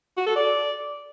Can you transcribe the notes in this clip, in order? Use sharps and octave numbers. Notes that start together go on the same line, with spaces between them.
F#4
A4
D5